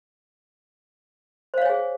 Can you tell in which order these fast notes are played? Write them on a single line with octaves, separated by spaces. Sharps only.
C5 F5 C#5 G#5 G#4